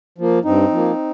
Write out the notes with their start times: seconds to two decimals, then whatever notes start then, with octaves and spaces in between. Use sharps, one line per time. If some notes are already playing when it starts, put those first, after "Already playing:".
0.18 F3 A#3
0.44 G2 C4 D#4
0.71 F3 A#3